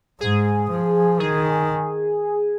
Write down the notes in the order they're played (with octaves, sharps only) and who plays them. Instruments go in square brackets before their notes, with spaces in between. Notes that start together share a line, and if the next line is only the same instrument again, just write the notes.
[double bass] G#2 [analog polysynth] G#4
[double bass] F3
[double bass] D#3 [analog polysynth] G#4